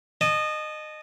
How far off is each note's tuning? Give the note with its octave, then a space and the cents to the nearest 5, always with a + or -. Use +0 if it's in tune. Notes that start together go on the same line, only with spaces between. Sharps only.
D#5 -25 A5 -25